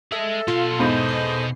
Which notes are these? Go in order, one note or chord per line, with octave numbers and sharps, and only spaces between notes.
G#4 A4 D#5 E5
B2 F4 C6
E2 G#2 A4 C5 D#5 B5
C7